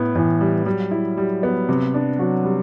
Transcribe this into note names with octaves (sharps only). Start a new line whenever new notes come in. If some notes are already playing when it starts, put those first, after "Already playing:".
Already playing: A2 B3
A2 E3
G3
F#3 G3
E4
G3
B3
C3
D4
F#3 F#4
G3